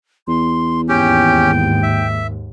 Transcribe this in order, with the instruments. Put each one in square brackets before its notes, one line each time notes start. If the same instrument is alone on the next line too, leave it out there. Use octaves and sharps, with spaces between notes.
[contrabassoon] E2 [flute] C6
[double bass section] D#2 G#2 [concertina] C#4 G4 [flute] G5
[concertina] E5